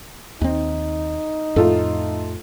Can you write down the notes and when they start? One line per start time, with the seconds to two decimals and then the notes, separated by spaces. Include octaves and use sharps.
0.41 D#2 C4 D#4
1.56 F2 A2 A3 F4 A4